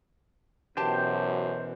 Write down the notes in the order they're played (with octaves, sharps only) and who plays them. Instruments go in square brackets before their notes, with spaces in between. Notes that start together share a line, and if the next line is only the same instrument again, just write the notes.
[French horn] F#2 [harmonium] B2 E3 [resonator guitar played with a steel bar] G4 A5 [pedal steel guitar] C5 G5